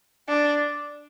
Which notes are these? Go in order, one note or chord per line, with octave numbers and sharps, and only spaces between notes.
D4